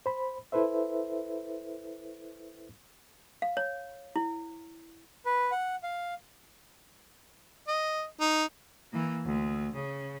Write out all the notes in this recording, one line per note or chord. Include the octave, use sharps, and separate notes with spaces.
C5 B5
E4 A4 B4 C5 E5
F5
C#5
E4
B4
F#5
F5
D#5
D#4
E3 A#3
D2
C#3